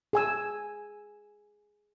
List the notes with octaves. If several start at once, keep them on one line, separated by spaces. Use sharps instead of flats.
G#4 G#5 E6